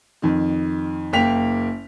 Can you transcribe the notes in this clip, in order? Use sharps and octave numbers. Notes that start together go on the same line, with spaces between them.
F2 D#3
F#1 A#3 G5 B6 F7